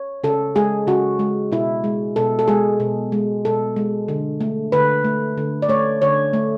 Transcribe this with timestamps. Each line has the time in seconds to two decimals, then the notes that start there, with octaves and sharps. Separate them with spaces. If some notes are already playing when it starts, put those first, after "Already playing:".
Already playing: C#5
0.24 C#3 A4
0.56 G#3 G#4
0.87 C#3 F#4
1.19 G#3
1.52 B2 E4
1.84 G#3
2.16 B2 A4
2.39 A4
2.48 G#3 G#4
2.80 B2
3.12 G#3
3.45 B2 A4
3.76 G#3
4.08 D3
4.41 A3
4.72 D3 B4
5.04 A3
5.38 D3
5.62 D5
5.69 A3 C#5
6.02 D3 C#5
6.33 A3